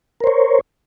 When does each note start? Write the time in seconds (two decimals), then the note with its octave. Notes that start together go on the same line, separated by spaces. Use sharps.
0.20 A#4
0.24 C5
0.27 C#5